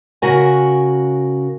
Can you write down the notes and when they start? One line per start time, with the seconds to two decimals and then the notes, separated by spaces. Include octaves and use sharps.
0.22 C#3 F#4 A#4 G#5